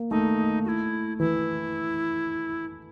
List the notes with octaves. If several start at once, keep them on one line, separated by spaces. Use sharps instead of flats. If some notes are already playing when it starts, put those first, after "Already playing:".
Already playing: A#3
A3 D#4
F#4
E4
E3 E4